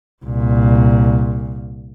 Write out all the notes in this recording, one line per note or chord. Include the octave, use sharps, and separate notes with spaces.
C2 A#2